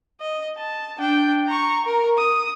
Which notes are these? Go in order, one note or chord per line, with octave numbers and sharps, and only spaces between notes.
D#5
A5
D4 G5
A#5 C#6
A#4
D#6